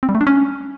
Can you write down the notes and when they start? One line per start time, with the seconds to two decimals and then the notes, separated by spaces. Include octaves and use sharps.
0.03 C4
0.09 G3
0.15 A3
0.21 D4
0.27 C#4